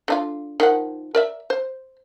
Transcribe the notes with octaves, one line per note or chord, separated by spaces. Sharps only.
D3 D#4 F4
D#3 F3 F#5
A#4 D5 E5
C5